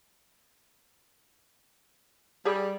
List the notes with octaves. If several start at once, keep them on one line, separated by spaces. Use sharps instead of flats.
G3 G4 G#4 B5